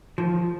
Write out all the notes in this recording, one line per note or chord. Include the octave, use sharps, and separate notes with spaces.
F3